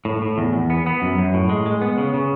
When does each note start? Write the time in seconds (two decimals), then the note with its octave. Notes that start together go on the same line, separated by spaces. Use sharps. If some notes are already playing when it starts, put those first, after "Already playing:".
0.05 A2
0.22 A2
0.38 E2
0.53 E2
0.70 B3
0.86 B3
1.02 F#2
1.18 F#2
1.34 A2
1.49 G#3
1.66 G#3
1.82 B3
1.98 C#3
2.14 C#3